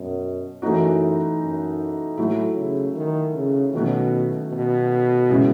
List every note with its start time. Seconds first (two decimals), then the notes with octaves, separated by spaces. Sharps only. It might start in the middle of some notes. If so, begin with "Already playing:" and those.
Already playing: F#2 B2
0.62 F#2 E3 A3 D#4 F#4
1.40 F#2
2.17 A2 F#3 A3 E4
2.57 C#3
2.96 D#3
3.35 C#3
3.73 B2 D#3 F#3 A3 C#4 F#4
4.52 B2
5.29 C#3 G#3 C#4 E4